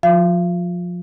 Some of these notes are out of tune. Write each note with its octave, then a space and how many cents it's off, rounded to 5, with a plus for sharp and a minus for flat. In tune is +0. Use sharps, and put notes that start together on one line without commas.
F3 +20 F4 +25 F5 -40